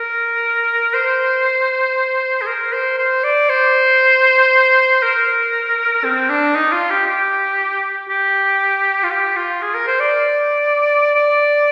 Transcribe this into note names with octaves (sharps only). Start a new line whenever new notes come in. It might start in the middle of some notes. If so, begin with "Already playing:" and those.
Already playing: A#4
C5
G#4
A#4
C5
C5
D5
C5
A#4
C4
D4
D#4
F4
G4
G4
G4
F4
G4
F4
G#4
A#4
C5
D5
D5